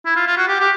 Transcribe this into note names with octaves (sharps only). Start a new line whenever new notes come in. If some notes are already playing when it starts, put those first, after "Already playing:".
E4
F4
F4
F#4
G4
G4